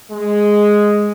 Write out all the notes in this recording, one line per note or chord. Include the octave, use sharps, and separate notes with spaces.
G#3